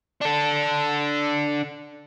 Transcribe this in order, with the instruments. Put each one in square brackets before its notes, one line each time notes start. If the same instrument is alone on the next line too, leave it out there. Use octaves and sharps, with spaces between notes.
[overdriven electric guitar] D4 A4